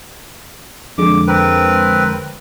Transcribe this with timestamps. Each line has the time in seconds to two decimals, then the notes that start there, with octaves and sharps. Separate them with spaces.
0.98 F2 D3 G#3 D6
1.27 C4 A#4 B4